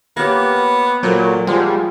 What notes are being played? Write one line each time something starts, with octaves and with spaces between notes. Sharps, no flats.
A#3 B3 G4 C#5 F6 A#6
A#2 F#3 A4 A#4 C5
F3 G3 G#3 C5 F#5 C6